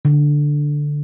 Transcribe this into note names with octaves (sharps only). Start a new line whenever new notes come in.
D3